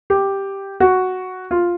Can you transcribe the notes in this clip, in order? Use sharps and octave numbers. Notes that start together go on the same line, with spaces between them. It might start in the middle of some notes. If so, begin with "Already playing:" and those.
G4
F#4
F4